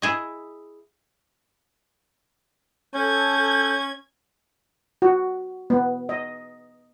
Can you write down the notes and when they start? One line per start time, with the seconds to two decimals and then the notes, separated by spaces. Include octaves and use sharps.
0.02 E4 G#4 D#5
2.94 C#4 A4 G6 G#6
5.02 F#4
5.70 B3
6.09 D#5